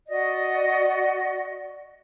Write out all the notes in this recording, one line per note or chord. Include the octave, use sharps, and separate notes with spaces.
F#4 D5 D#5